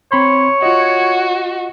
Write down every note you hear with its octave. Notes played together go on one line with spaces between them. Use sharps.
C4 C#5 B5 C6
F4 F#4 D#5